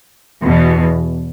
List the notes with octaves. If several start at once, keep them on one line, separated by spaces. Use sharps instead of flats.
E2 B2